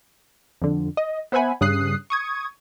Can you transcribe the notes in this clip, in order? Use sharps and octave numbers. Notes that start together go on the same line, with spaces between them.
F2 D3
D#5
B3 C5 E5 F#5 G#5 B5
G2 C#3 D#6 F#6 C7
C#6 D#6 G#6